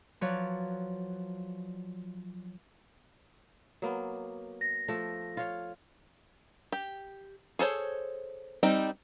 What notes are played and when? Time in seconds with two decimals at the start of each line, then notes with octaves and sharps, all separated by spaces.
0.21 F3 F#3 B4 C#5 D5
3.82 F#3 A#3 B3
4.61 A#6
4.88 F3 A3
5.37 F4 C#5 F5
6.72 G4
7.59 G#4 A4 C5 C#5
8.63 G3 C4 D#4 G5